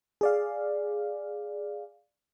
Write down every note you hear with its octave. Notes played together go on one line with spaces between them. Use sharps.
G#4 D5 F5